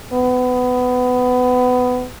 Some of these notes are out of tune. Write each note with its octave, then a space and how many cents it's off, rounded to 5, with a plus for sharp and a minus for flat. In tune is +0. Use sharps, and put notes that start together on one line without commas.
B3 +20